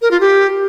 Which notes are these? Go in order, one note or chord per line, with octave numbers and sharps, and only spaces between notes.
A#4
F4
G4